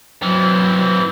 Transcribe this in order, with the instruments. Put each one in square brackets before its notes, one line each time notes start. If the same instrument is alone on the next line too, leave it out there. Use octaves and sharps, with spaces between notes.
[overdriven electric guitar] E3 C4 [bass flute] F#3